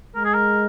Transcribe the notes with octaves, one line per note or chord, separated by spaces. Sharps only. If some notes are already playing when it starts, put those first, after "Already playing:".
G#3 A#4
G#4
A#4